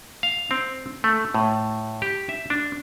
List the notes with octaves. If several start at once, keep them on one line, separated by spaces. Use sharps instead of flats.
F5
C4
A3
A2
G4
E5
D4